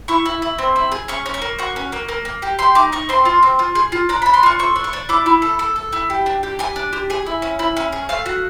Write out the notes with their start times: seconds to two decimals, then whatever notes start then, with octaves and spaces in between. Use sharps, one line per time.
0.08 E4 C#6
0.26 E4
0.42 E4
0.58 C4
0.76 E4
0.92 G#4
1.08 C#4 C#6
1.26 C#4
1.34 C#6
1.42 A#3
1.59 F#4 C#6
1.76 C#4
1.92 A#3
2.09 A#3
2.25 A#3
2.42 G4
2.59 G4 C6
2.75 D#4 D6
2.92 D#4 C#6
3.09 C4 C6
3.25 F4
3.43 C4
3.59 F4
3.75 G#4
3.92 F4
4.09 D4 A#5
4.22 D4 B5
4.34 C6
4.43 F4 C#6
4.59 A4 C#6
4.76 D4
4.84 C#6
4.93 D4
5.09 E4 D6
5.26 E4
5.42 A4
5.59 A4
5.76 A4
5.93 E4
6.10 G4
6.26 D4
6.43 G4
6.59 G4 G#5
6.76 D4
6.93 G4
7.10 G#4 G#5
7.26 E4
7.42 C#4
7.59 E4
7.77 C#4
7.92 G#4
8.09 A3 F5
8.26 F#4